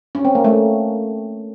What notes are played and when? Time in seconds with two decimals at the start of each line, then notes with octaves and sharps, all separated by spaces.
0.15 C#4
0.25 C4
0.35 A#3
0.44 A3